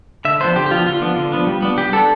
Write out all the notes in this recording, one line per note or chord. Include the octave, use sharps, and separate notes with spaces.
D3 E5
F3 B3 D4 C5
D3 G4
G4
F3 B3 D4 F4
D3 F4
F3 B3 D4
D3
F3 B3 D4
G3
B3 D4
G3 G4
B3 D4 A4